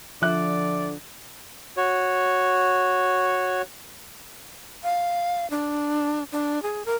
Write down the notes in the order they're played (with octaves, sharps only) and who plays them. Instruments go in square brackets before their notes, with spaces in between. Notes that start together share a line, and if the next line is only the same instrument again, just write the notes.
[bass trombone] D3 [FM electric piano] F3 [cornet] D5 [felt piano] E5 F#6
[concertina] F#4 C#5
[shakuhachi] F5
D4
D4
G#4
A#4